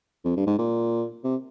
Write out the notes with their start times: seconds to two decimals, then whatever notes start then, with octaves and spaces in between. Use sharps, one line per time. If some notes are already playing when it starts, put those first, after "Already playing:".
0.25 F2
0.36 G2
0.47 G#2
0.58 A#2
1.24 C3